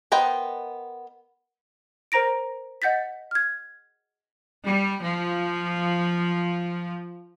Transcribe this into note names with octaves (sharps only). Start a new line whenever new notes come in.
B3 A#4 C5 D#5 G5
A#4 C5 A#5 A#6 D7
D#5 F#5 G6 A6 B6
F6 G#6
G3
F3